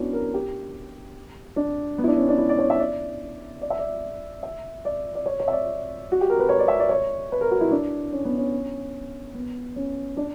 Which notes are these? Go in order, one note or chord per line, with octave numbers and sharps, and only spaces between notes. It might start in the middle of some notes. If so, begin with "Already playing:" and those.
Already playing: B3 C#4 D4 E4 F#4
A#4
G4
D4
B3
E4
D4
C#4
D4
E4
D5
C#5
E5
D5
D5
E5
D5
E5
D5
D5
C#5
C#5
E5
D5
F#4
G4
A#4
B4
C#5
D5
E5
D5
C#5
B4
A#4
F#4
E4
D4
C#4
B3
C#4
B3
C#4
D4